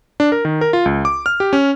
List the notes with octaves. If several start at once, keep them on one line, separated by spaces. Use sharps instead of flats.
D4
A#4
D#3
A#4
F4
C#2
D6
F6
G4
C#4